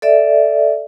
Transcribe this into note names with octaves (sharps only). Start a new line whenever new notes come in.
A4 D5 E5